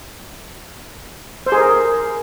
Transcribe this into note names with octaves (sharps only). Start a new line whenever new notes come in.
C5
G#4
A#4